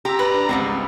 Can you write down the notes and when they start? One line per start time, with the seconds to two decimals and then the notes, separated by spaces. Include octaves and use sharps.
0.05 G4 A#5 C6 E6
0.19 B4 D5
0.34 D4
0.49 G#1 C#2 G3 B3 C4